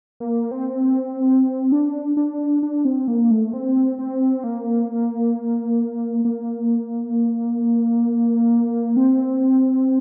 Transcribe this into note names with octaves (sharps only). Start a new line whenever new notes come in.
A#3
C4
D4
D4
D4
C4
A#3
A3
C4
C4
A#3
A#3
C4